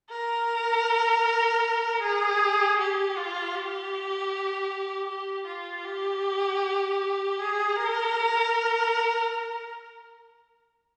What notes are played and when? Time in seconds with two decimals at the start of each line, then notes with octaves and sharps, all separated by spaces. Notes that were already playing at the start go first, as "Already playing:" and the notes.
0.10 A#4
2.02 G#4
2.79 G4
3.17 F4
3.55 G4
5.09 G4
5.47 F4
5.85 G4
7.39 G#4
7.77 A#4